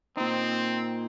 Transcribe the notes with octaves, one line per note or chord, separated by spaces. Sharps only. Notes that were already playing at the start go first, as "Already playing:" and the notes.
A#2 C4 D#4